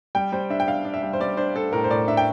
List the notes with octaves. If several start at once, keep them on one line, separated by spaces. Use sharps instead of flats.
G3 G5
G3 C5
D4 E5
G5
D4 F5
D4
E5
G3
C5
G3 D5
D4 C5
D4 A4
A2 A#4
C5
A2 D5
D4 E5
G5